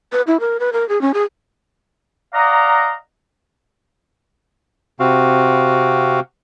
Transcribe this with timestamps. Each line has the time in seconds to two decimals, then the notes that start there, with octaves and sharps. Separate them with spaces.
0.12 B4
0.27 E4
0.40 A#4
0.60 B4
0.73 A#4
0.89 G#4
1.01 C#4
1.14 G#4
2.34 D5 D#5 F5 F#5 A#5
5.00 C3 C4 F#4 F5